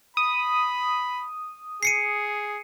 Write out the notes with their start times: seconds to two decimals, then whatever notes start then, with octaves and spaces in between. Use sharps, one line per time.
0.17 B5 D#6
1.83 G#4 C7 C#7 D#7